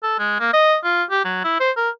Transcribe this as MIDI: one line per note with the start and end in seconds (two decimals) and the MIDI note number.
0.03 0.19 69
0.19 0.37 56
0.40 0.53 58
0.53 0.76 75
0.84 1.04 65
1.11 1.22 67
1.25 1.40 54
1.44 1.56 64
1.60 1.71 72
1.77 1.90 70